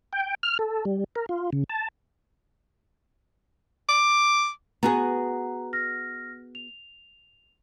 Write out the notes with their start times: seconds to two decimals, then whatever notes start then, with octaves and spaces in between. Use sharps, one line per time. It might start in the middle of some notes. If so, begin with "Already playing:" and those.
0.13 G5
0.43 F6
0.59 A4
0.85 G3
1.16 A#4
1.29 F4
1.53 C#3
1.70 A5
3.89 D6
4.83 B3 F#4 G#4 A#5
5.73 F6 A#6
6.55 F7